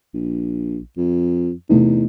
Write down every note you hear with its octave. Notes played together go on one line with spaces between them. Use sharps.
A#1
F2
E2 C3 A3 D#4